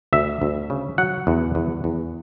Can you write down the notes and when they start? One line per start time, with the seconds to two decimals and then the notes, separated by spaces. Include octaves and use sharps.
0.13 D2 E5
0.42 D2
0.70 C#3
0.98 F#3 F#5
1.27 E2
1.55 E2
1.84 E2